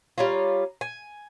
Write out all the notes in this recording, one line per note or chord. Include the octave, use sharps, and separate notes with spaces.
G3 C#4 F4 A#5
G#5